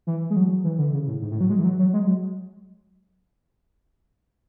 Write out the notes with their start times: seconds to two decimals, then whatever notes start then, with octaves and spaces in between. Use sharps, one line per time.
0.07 E3
0.30 G#3
0.36 F#3
0.64 E3
0.78 D3
0.93 C#3
1.07 A2
1.21 G#2
1.31 A2
1.40 F#3
1.50 G#3
1.58 E3
1.65 F#3
1.79 F#3
1.93 G#3
2.07 F#3